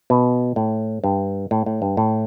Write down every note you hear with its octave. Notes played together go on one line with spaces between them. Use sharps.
B2
A2
G2
A2
A2
G2
A2